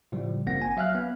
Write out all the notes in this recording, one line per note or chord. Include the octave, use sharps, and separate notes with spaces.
A2 C#3 F3 G3
G1 A#3 C4 F#5 A#6
G#5
F#3 E5 F5 F6 F#6
B3